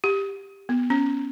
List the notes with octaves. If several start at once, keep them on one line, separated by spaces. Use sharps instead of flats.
G4
B3
C#4